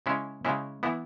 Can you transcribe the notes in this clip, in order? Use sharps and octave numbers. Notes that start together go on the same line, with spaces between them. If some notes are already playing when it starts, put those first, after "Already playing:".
C#3 G#3 C#4 E4
C#3 G#3 C#4 E4
E3 B3 E4